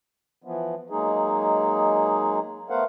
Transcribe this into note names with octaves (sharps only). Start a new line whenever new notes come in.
E3 F3 B3
F#3 G#3 A#3 D#4 G#4
A3 B3 A#4 C5 F5 F#5